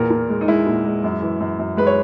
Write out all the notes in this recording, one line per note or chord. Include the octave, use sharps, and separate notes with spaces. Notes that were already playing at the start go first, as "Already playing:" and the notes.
Already playing: E2 A#2 A#4
A#2
G#3
D#4
G#3 E4
A#2
G#3
F#2
E3
F#2
F#2
G#3 B4
C#5